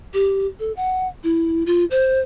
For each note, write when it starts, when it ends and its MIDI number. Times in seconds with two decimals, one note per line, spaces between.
0.14 0.46 67
0.60 0.72 69
0.77 1.08 78
1.24 1.64 64
1.66 1.85 65
1.91 2.20 72